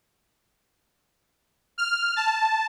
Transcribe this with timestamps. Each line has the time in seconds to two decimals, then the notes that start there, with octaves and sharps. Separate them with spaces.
1.78 F6
2.16 A5